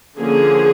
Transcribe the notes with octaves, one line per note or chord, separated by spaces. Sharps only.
D3 F3 A#3 C#4 G#4